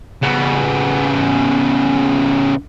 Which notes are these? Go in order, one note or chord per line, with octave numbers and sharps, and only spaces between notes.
C#3 B3